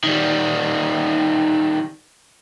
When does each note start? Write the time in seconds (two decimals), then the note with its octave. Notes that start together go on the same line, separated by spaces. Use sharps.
0.03 D#3 G3